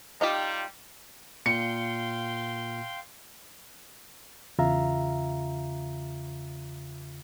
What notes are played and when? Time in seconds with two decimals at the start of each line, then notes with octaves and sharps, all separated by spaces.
0.21 G3 D#4 F4 G4
1.46 A#2 F5 G5 C6 C#7
4.58 E2 C#3 F4 E5 F5 A#5